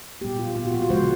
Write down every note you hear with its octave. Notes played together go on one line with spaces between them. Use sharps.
A#2 G3 B3 G4
F4
A#2 G3 B3 F4
F#4
F4
F#4
C#3 F3 G#3 C5